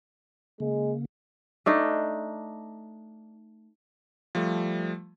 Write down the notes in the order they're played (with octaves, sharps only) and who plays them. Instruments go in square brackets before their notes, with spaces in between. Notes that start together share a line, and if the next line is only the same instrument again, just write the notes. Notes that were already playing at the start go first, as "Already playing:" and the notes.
[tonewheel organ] C#3 A#3 [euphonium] G#3
[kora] A3 D4 D#4
[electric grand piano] F3 G3 A3